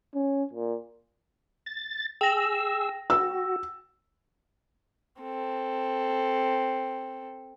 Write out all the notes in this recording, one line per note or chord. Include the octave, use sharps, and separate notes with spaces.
C#4
A#2
A6
G#4 G5 E6 A#6
F#4 E6
C4 A4